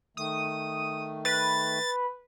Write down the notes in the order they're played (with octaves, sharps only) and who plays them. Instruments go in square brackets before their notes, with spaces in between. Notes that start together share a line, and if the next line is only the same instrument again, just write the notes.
[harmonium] D#3 A3 [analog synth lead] D#6
[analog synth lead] B4 [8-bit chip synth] A6